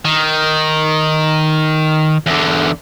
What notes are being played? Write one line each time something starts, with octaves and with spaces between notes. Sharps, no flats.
D#3
E2 D3